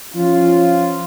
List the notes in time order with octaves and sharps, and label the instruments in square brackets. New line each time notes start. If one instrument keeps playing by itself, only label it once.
[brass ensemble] F3 C#4 F4